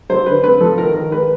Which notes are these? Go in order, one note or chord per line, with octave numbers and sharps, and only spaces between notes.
F#3 C5
D3 B4
C4 B4
F3 A4
D#3 A#4
D#3 A#4
G#3 B4